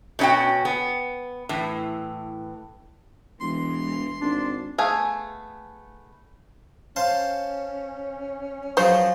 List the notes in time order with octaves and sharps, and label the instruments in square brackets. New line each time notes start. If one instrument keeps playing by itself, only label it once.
[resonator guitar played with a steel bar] B2 C#4 D#4 F#4 G5
B3
A2 E3
[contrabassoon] E1 [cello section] E3 G#3 [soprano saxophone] C6
[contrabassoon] G#1 [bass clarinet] D4
[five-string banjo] A3 B3 G#4 F5
[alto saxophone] C#4 [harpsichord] C5 F5 A5
[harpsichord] F3 F#3 G#4 [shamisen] C5 C#5